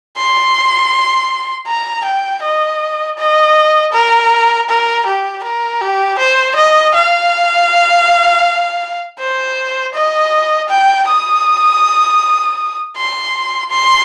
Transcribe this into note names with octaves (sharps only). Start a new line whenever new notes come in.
C6
A#5
G5
D#5
D#5
A#4
A#4
G4
A#4
G4
C5
D#5
F5
C5
D#5
G5
D#6
C6
C6